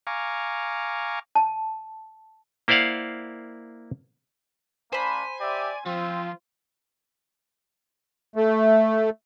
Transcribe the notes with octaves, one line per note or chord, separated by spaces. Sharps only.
F5 G#5 A#5 C#6 D6
A5
A#3 E4 C5 D5 F5 F#5
A#3 D4 C5 G#5 B5
G4 D5 E5
F3 C4 F4
A3